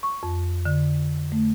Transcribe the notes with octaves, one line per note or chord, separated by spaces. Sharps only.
C#6
F2
D3
A3